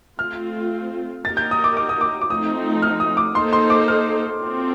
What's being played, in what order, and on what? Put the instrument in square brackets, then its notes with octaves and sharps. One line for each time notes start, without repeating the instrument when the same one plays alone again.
[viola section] A3 C4 F4 [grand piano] F6
[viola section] A#3 D#4 G4 A#4 D#5 [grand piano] A6
[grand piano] G6
D#6
D6
D6
D#6
D6
D6
[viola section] F3 A3 C4 D#4 [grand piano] D#6
[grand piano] F6
D#6
D6
[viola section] A#3 D#4 A4 C5 [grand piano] C6
[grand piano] C6
D6
F6
[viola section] C4 F4 A4